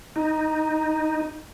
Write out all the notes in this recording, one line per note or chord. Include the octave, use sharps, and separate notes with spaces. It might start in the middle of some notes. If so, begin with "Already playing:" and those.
D#4